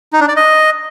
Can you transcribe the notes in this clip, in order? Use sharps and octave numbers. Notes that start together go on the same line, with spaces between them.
D#4
D4
D5
D#5